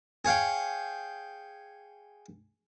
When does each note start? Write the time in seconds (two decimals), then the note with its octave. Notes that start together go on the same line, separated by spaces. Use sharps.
0.25 G#4 C#5 F5 G5